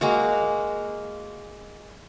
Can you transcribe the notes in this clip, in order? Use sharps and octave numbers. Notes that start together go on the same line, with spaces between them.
G#3 A#3 F#4